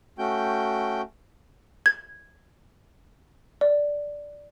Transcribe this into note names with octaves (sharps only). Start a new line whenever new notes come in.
A3 C#4 F#4 G5 G6
G#6
D5